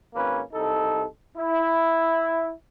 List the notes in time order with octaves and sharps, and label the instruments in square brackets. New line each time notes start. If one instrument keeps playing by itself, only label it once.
[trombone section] G#1 A#3 C#4 B4
C2 D#4 A4
E4